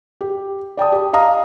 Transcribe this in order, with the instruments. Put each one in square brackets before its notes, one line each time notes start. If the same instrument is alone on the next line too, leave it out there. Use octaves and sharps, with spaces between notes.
[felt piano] G4
D5 G5 A5 D#6
G4
D#5 F5 A#5 D#6